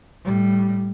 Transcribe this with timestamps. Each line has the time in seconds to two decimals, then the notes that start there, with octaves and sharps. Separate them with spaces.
0.24 A2 G3